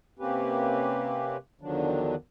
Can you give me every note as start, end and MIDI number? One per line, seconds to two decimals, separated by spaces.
0.19 1.37 48
0.19 1.37 58
0.19 1.37 60
0.19 1.37 61
0.19 1.37 67
0.19 1.37 71
1.61 2.15 40
1.61 2.15 50
1.61 2.15 51
1.61 2.15 53
1.61 2.15 54
1.61 2.15 62